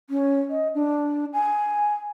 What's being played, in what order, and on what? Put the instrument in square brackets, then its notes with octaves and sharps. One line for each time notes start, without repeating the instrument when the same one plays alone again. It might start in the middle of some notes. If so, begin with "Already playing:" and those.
[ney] C#4
D#5
D4
G#5